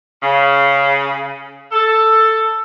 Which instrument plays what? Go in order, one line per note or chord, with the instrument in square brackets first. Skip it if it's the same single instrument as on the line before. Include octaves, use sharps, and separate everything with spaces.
[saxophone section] C#3
A4